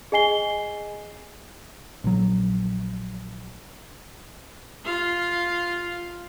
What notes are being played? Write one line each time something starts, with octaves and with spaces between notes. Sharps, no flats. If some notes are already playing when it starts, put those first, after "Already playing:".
G#4 D#5 G#5 C7 G7
A#1 F#3
F4 F5